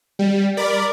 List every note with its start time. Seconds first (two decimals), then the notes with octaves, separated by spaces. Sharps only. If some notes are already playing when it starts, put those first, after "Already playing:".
0.19 G3
0.57 A#4 D5 B5 D6